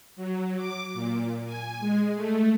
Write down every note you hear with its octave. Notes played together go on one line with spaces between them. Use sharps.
F#3
D6
A#2
G#5
G#3
A3